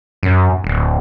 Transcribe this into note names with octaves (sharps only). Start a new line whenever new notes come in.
F#2
D1